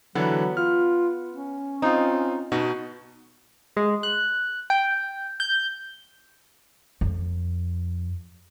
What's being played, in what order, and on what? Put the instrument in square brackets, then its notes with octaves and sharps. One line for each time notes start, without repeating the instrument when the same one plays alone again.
[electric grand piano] D3 E3 [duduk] F#3 [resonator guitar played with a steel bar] B3
[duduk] F4 [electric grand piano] F6
[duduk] C#4
[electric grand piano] C4 F4 [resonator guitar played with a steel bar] D#4
[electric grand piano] B2 D#4 F#4
[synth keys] G#3
F#6
G5
G6
[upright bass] F2